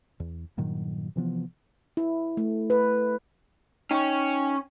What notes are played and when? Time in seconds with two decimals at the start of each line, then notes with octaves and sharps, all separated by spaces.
0.20 E2
0.57 G2 A#2 D#3 F#3
1.16 C3 E3 F3 B3
1.97 E4
2.37 A3
2.70 B4
3.91 C#4 D#4 G5 G#5 C#6